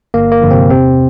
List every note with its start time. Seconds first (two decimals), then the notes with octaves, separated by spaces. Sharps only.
0.14 G1 A#3
0.32 A#3
0.41 G2 D3 F3
0.51 C3 C4
0.70 E2 C3 C4